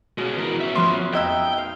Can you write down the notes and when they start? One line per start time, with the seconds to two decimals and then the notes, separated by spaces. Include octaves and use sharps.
0.18 B2 G#3 C#4
0.38 E3 A#4
0.60 C#4 E5
0.76 F3 B3 C6
1.13 F2 D#4 D#5 E5 G5 E6
1.58 F5